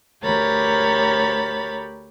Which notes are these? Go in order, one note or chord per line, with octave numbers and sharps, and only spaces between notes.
D2 G4 A#4 C#5 B5 A6